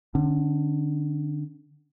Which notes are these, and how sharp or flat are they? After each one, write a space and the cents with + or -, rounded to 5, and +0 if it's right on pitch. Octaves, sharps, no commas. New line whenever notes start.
D3 +25 C#4 -5